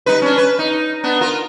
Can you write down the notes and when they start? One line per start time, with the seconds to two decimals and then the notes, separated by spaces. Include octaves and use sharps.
0.06 G3 D#4 B4
0.22 C#4 D4
0.37 B4
0.59 D#4
1.04 B3 D4
1.21 F4 A#4